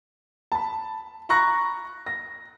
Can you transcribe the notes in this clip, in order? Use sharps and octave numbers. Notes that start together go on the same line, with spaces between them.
A5 B5
A#5 B5 C#6 F#6 A#6
A#6